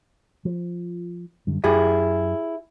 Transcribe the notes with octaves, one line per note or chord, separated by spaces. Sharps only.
F3
F#2 D3 G3
F#2 E4 G4 G#4